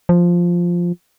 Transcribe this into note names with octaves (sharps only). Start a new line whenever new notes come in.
F3